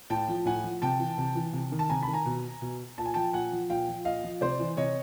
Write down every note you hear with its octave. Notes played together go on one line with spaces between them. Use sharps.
A2 G5 A5
F3
A2 F#5 G#5
F3
C3 G5 A5
E3
C3
E3
C3
D#3
A5
C3 G#5 A#5
A5 B5
D#3
G#5 A#5
B2
B2
A#2 A5
G#5
F3 G5 A5
A#2 F#5 G#5
F3
A#2 F5 G5
F3
A#2 D#5 F5
F3
C3 C5 D5
E3
C3 C#5 D#5